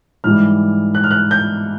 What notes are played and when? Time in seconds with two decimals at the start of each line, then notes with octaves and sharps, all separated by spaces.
0.24 G#2 E3 G3 F6
0.95 F#6
1.04 F6
1.11 F#6
1.31 G6